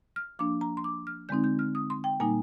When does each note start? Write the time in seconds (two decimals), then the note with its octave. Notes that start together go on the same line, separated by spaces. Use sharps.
0.16 F6
0.39 F3 A#3 D4 D6
0.61 A#5
0.77 C6
0.84 D6
1.07 F6
1.29 D3 G#3 C4 D#4 G6
1.44 G6
1.59 F6
1.75 D#6
1.90 C6
2.04 G5
2.20 A#2 G3 A#3 D#4 G#5